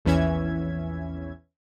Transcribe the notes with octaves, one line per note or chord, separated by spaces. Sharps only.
A#1 E2 E3 C#4 E5 G#6